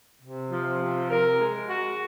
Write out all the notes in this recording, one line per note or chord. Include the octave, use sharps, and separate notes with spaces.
C3
F3
C3
A#4
G#3
F#4